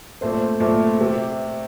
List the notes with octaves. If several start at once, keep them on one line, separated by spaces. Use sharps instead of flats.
A#2 A3 C4 C5
A#2 A3 C4
C3